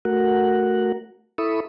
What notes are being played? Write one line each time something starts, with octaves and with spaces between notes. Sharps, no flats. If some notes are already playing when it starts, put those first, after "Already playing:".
A3 F#4 A#4 F#5
E4 A4 E5 B5 C#6 D#6